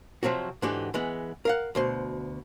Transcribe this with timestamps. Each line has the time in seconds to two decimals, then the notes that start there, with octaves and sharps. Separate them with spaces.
0.23 C3 F3 F#3 C4 F#4
0.62 G#2 D3 E3 F#4 G4
0.94 E3 G#3 B3
1.45 A#4 F5 F#5
1.75 D2 B2 C5